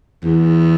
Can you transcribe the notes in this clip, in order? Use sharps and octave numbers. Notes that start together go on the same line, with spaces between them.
E2